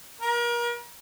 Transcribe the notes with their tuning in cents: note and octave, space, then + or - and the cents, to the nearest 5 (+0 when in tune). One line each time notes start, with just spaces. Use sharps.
A#4 +35